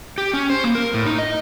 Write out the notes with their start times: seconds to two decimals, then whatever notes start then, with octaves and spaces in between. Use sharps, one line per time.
0.18 G4
0.34 C#4
0.50 C5
0.64 A#3
0.75 A#4
0.94 A2
1.06 D#4
1.19 D#5